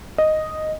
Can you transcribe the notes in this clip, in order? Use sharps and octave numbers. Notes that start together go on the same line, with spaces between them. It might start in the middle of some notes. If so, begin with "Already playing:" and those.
D#5